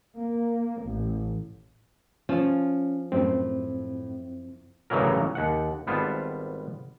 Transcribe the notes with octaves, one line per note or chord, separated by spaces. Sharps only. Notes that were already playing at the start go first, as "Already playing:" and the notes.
A#3
A1
F3 C#4
F#2 A2 C4
A1 G2 C#3 E3 F#3 A#4
D#2 F#5
G#1 G3 B3 F4 A5